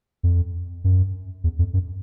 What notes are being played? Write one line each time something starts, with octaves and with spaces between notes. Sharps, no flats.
F2
F#2
E2
F2
F#2